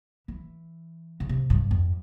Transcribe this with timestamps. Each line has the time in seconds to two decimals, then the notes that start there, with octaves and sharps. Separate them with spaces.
0.28 E3
1.20 C#3
1.29 C3
1.50 G2
1.71 F2